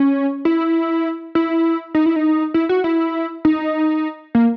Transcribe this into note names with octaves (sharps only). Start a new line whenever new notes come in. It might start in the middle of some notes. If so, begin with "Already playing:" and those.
Already playing: C#4
E4
E4
D#4
E4
D#4
E4
F#4
E4
D#4
A#3